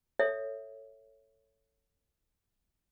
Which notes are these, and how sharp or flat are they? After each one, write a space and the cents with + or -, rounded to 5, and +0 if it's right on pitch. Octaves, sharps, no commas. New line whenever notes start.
A4 +15 C#5 +0 E5 +0